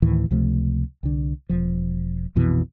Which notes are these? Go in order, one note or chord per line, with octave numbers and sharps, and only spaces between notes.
D2 A2 D#3 E3
C#2 C3 F3 A3
C2 D3
E1 F3
A#1 F2 B2 E3